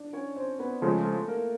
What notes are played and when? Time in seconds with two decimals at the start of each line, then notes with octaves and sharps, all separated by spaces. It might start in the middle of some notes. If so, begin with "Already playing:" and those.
Already playing: D4 D5
0.13 C#4 C#5
0.36 C4 C5
0.59 B3 B4
0.82 C#3 F3 G#3 A3 A4
1.05 A3 A4
1.28 A#3 A#4